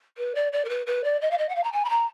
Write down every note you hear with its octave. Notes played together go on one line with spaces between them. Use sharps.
B4
D5
D5
A#4
B4
B4
D5
D#5
F5
D#5
F#5
F5
A#5
G#5
B5
A#5